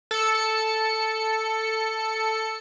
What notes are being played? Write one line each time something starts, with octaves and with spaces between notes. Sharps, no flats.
A4 C#7